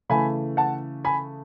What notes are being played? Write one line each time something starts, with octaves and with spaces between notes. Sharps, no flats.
C#3 E3 A3 G#5 B5
F#5 A5
G#5 B5